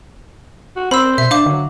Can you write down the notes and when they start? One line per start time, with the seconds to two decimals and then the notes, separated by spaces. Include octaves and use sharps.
0.76 F#4
0.91 C4 C5 B5 E6
1.18 B2 E5
1.31 D4 F5 D6
1.46 D3 F#3